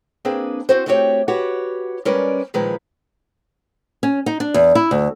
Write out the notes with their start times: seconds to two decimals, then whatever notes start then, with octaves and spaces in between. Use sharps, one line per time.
0.25 A#3 C4 D4 G#4 B4
0.69 C4 F#4 C5
0.86 A3 B3 C4 F#4 G4 C#5
1.28 F#4 G4 B4 C#5 F#5
2.05 G3 G#3 C#4 A#4 B4 D5
2.54 A#2 D#3 F3 G#3 B4
4.03 C#4
4.26 D#4
4.40 D4
4.54 E2
4.75 E4
4.91 D2